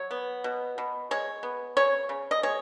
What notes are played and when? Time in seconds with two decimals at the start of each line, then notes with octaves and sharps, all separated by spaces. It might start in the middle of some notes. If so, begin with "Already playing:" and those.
Already playing: F#3 C#5
0.11 B3
0.44 B2
0.78 B2
1.11 G#3 C#5
1.43 B3
1.77 C#3 C#5
2.09 C#3
2.31 D#5
2.43 G#3 C#5